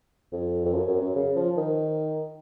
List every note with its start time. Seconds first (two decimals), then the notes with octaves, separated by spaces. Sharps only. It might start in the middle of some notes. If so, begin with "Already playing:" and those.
0.32 F2
0.65 F2
0.74 F#2
0.88 F#2
1.01 F#2
1.16 C#3
1.36 F3
1.57 D#3